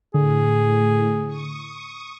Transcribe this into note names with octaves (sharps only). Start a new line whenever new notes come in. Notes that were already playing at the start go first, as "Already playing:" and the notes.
A2 D3 G#4
C#6 D#6